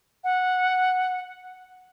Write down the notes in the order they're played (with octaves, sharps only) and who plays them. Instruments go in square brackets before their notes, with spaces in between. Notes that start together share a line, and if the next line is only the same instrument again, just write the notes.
[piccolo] F#5